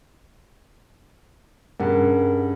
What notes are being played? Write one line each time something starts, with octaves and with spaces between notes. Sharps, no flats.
G2 C#3 A#4 F#5